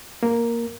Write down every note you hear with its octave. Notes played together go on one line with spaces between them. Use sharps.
A#3